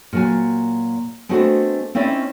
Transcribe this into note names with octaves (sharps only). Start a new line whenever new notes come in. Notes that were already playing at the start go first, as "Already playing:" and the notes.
A#2 F#3 G#5
G#3 A3 B3 C4 D4 F#4
C4 C#4 D#4 E4 D5